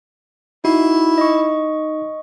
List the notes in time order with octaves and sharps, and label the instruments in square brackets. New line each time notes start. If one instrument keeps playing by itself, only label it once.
[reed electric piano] D#4 [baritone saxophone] E4 [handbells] F#4
[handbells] D#5 C#6